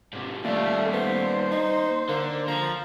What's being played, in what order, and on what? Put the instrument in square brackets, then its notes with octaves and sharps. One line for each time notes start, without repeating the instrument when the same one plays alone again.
[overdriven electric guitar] G#2 C3
[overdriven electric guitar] D#2 G3 [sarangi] A3 [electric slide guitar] A#3 D5 E5 [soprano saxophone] F4
[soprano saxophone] B3 [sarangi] C5
[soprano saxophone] D#4
[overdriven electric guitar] D3 [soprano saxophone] A#3
[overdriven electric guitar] F3 [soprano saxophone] A#5